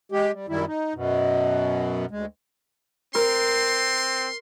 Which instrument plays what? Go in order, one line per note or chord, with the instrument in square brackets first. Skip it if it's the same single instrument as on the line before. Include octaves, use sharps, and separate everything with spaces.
[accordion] G#3 G4
G3
F#2 D#3 G3 E4
D#4
F#2 B2
D2 G#3
[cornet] C4 [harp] A#4 [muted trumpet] C6